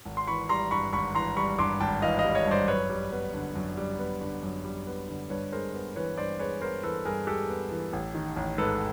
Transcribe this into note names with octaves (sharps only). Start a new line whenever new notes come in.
G#1
C6
E3 B5 C#6
G3 A#5 C6
G2 B5 C#6
G#1 B5 C#6
E3 A#5 C6
G3 B5 C#6
G2 C6 D6
G#1 G5 A5
E3 D#5 F5
D#5 F5
G3
C#5 D#5
G2
C5 D5
F#2 B4 C#5
G3
B3
D3
F#2
G3
B3
D3
F#2
G3
B3
D3
G2 B4 C#5
G#3 A#4 C5
B3
E3 B4 C#5
G2 C5 D5
G#3 B4 C#5
B3 A#4 C5
E3 A4 B4
G2 G#4 A#4
G#3 G4 A4
B3
E3
A1
D#3
A1
G#2 A4 B4